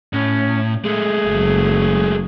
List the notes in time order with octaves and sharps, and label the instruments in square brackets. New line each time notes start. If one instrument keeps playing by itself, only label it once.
[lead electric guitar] A2 [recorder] C#4
[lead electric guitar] G#3 A3 [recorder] G#4
[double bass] F#1 F#3